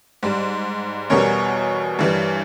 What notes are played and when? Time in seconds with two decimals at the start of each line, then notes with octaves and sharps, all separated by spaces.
0.23 G#2 G3
1.10 E2 B2 G3 A#4 C#5
1.99 G2 E3 G3